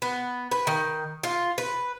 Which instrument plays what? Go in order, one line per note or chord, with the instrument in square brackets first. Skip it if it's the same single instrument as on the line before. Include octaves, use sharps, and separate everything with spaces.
[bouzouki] B3
B4
D#3
F4
B4